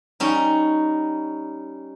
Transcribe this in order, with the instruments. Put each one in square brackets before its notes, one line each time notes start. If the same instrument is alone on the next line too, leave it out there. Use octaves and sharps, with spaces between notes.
[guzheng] G3 C#4 D#4